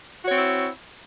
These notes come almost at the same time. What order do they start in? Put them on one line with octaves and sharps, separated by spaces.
F#4 C#5 C4 E4